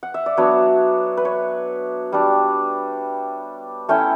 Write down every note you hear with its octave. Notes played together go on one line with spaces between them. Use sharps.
F#5
E5
D5
F#3 B3 D4 C#5
B4
C#5
G3 D4
A3 C#4 E4 G5